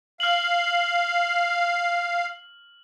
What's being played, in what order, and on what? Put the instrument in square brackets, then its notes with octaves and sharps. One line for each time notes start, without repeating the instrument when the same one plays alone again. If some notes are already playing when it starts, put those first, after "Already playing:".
[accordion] F5 [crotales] F6 F#7